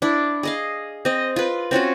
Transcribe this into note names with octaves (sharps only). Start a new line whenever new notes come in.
D4 E4
G#4 D#5 F5
C4 D#5
F4 B4
C4 C#4 F4 F#4